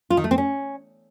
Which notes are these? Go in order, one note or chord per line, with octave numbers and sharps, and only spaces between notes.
F4
D#3
A3
C4
C#4